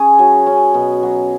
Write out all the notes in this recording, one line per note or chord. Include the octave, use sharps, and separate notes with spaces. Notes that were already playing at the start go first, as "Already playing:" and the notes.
Already playing: C#4 G#4
F#3
C#4
B2
F#3